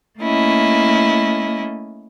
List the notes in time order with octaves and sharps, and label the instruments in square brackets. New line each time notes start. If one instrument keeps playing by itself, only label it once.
[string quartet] A3 A#3 C#4 E4 D#5